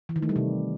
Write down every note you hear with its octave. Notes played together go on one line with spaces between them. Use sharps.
E3
D#3
A3
G3
C3